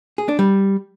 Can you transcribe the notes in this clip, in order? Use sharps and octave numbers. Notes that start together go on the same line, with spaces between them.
G#4
D4
G3